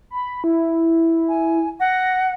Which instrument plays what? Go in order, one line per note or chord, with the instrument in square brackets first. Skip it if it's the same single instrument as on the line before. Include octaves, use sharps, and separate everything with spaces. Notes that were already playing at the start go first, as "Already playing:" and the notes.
[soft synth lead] B5
E4
[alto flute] G#5
[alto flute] F#5 [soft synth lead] A#6